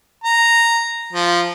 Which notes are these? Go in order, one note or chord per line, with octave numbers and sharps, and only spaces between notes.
A#5
F3